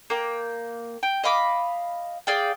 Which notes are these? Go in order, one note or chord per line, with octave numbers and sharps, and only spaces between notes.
A#3 G5
G5
D#5 F5 B5 D6
G#4 D5 F5 G5